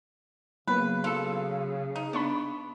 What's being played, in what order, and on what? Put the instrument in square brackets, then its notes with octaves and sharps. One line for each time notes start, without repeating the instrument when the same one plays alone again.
[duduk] C#3 [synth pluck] F#3 A#3 B3 [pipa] B4
[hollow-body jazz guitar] F#3 A4 [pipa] F4 [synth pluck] E6
[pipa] D#4
[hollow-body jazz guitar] B3 D4 [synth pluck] B5 C#6